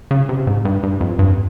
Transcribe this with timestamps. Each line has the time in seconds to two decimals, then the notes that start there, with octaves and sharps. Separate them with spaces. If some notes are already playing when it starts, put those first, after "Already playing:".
0.11 C#3
0.29 C3
0.47 G#2
0.65 G2
0.83 G2
1.01 F2
1.19 G2